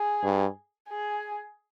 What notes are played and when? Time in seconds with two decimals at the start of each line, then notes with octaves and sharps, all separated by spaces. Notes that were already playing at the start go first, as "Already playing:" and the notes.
Already playing: G#4
0.24 G2
0.89 G#4